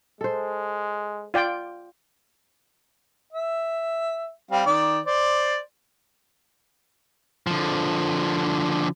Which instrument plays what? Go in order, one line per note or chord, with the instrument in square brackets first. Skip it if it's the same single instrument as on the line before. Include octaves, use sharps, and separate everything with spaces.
[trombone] G#3 [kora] A4 C5
[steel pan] F4 D5 G5
[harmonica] E5
G3 C4 F5
D#3 D5
C5 D5
[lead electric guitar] D3 F3